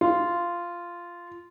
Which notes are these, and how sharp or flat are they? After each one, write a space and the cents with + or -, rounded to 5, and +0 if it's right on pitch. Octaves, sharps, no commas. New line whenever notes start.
F4 -10